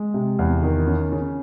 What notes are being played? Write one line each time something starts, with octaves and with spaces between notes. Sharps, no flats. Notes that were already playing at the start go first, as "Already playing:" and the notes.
Already playing: G#3
C3
E2
D#3
C#4
C#3